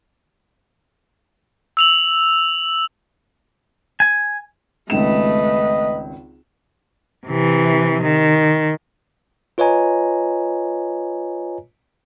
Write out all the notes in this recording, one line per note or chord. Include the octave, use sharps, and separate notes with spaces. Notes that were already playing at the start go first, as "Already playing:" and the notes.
E6 F7 F#7
G#5
G#1 C#2 A3 B4 D#5 E7
C3 E3
D#3
F4 B4 C#5 D#5 G#5 A#5